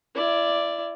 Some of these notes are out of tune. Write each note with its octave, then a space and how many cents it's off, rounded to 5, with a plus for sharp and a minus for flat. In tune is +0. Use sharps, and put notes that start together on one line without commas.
E4 +30 D5 +0